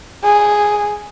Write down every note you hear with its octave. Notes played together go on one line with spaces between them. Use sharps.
G#4